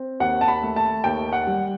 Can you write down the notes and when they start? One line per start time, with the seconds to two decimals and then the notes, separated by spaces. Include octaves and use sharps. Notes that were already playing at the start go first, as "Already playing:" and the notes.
Already playing: C4
0.20 D#2 F#5
0.41 A5
0.48 B5
0.63 A3
0.76 A5
1.04 D#2 G5
1.33 F#5
1.47 G3